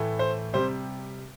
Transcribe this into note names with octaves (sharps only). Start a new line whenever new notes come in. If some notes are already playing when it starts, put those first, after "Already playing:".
Already playing: A2 E3 A3
C5
C3 G3 C5